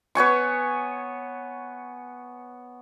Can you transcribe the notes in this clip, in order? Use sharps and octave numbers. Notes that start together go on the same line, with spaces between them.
B3 C#5 G#5 C#6